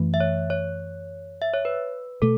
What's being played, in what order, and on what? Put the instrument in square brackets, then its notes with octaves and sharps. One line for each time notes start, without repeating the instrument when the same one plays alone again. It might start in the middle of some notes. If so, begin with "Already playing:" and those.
Already playing: [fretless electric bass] F#2 E3 A3
[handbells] E5
C#5
C#5
E5
C#5
B4
[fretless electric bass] B2 A3 [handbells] A4